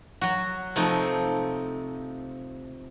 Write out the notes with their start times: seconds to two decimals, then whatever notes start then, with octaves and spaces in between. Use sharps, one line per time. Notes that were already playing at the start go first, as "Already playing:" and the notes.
0.21 F#3 F#4
0.76 C3 F3 A3 D#4